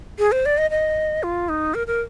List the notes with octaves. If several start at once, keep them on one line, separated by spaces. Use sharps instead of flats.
G#4
C5
D5
D#5
D#5
F4
D#4
A#4
A#4